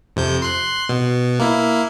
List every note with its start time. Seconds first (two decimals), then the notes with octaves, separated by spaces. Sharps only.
0.16 F2 C3 G6
0.42 C6 F#6
0.89 B2
1.39 A#3 E4